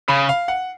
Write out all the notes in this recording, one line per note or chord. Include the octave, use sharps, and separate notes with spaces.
C#3 B5
F5
F#5